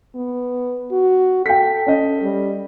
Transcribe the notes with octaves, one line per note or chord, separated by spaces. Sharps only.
B3
F#4
A4 G5 B6
C#4 D#5
G3